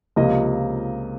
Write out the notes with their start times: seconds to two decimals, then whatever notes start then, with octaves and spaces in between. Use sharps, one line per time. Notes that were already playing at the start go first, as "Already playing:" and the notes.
0.16 C#2 C3 F3 A#3 D#5